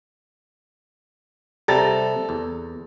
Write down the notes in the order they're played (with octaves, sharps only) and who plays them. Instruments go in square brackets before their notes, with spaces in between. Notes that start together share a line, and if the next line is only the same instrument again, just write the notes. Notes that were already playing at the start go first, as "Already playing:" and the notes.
[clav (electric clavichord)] C3 G3 [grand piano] A4 A#5 A6
[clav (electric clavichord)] E2